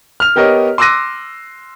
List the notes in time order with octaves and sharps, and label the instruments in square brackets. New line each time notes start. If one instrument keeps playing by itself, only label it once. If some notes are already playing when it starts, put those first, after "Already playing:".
[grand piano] F6 F7
B3 G4 A#4 C#5 D#5
C6 D6 E6 F#6 A#6 D#7